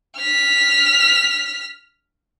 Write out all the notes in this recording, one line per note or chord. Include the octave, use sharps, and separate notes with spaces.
F6 B6